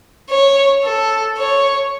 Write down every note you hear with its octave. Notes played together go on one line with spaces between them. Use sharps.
C#5
A4
C#5